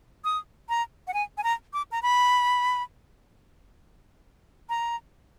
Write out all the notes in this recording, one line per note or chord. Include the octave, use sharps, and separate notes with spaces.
D#6
A#5
F#5
G#5
G#5
A#5
D6
A#5
B5
A#5